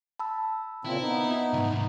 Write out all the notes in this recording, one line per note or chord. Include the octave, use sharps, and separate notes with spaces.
A5 B5 E6
A#2 C#3 C4 E4
B3 D#4
C2 G#2